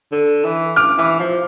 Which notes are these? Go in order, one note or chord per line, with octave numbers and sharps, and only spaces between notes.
D3
E3
D6 F6
E3
F3